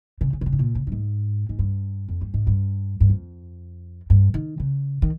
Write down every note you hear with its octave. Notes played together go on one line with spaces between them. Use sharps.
C#3
C#3
C3
C#3
G#2
A#2
C#3
G2
G#2
G#2
G2
F2
G2
G#2
G2
G2
F2
G2
D#3
C#3
D#3